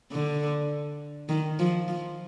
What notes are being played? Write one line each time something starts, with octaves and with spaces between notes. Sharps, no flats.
D3
D#3
F3
F3